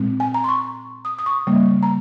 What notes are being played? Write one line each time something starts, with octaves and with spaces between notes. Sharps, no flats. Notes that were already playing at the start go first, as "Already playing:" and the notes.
Already playing: A#2 G#3 C4
G#5
A#5
C6
C#6
D#6
D#6
C#6
C#3 G3 A#3
A#5